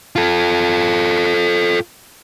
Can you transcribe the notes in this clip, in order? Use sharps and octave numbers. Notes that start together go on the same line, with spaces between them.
F4 A4